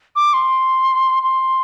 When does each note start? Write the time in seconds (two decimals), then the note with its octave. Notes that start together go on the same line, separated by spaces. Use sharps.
0.16 D6
0.33 C6
1.23 C6